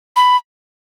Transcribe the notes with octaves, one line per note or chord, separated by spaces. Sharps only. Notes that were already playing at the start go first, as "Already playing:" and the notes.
B5